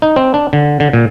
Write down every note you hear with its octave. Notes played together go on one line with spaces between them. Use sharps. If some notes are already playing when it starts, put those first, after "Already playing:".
D#4
C4
D4
D3
D3
A#2